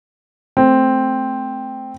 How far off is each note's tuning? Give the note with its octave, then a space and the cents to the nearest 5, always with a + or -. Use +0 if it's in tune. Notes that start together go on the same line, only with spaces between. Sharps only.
A3 -5 C4 +0